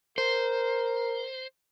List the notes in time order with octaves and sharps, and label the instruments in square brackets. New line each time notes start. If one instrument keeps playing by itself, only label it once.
[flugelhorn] A#4 [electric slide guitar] C5